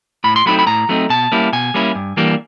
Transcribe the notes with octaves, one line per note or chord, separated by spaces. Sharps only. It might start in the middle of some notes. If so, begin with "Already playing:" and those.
A2 B5
C6
F#3 A3 C4 D#4 B5
B5
A2 A#5
F#3 A3 C4 D#4
B2 A5
G3 A#3 C#4 E4
B2 G#5
G3 A#3 C#4 E4
G2
E3 G3 A#3 D4